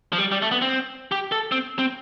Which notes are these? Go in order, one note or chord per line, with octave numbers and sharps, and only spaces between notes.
F3
G3
G3
A3
B3
C4
G4
A4
C4
C4